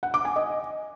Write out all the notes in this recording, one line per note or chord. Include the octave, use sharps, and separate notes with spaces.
F#5
D6
G#5
D#5